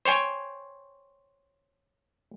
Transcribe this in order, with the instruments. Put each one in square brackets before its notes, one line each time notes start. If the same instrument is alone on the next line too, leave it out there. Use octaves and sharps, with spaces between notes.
[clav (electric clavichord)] C5 C#5 G5 G#5